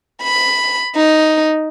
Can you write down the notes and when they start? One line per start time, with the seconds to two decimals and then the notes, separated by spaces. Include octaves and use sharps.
0.23 B5
0.95 D#4